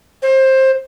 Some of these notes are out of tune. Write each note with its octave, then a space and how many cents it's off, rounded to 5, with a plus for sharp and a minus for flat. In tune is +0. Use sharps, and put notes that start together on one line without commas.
C5 +20